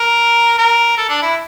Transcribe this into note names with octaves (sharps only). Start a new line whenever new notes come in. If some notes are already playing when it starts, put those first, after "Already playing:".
Already playing: A#4
A#4
A4
D4
E4